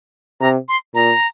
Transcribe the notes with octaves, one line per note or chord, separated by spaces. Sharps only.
C3 A#5
C6
A#2 A#5